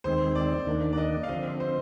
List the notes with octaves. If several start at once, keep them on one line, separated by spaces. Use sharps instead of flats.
D#2 D#3 G#3 C4 C5
D5
D#2 D#3 A#3 D4
D5
D#5
F5
D3 F3 C4 D#5
C5